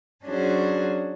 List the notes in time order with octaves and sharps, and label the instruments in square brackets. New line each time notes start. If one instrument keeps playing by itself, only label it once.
[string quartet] F#3 C#4 D4 F#4 G#4 C5